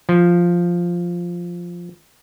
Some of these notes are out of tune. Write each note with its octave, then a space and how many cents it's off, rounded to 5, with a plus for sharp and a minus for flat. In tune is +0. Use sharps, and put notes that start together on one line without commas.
F3 +0